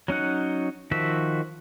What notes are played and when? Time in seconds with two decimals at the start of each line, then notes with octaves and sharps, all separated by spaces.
0.08 F#3 C#4 D#4 F#5
0.91 D#3 F3 F#4 E5